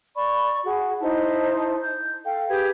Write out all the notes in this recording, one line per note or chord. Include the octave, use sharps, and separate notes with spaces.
D5 B5 C#6
F#4 G#4 F#5
D#4 E4 C5 A5
G6
A4 F5 G5
G4 G#4 B4 G#6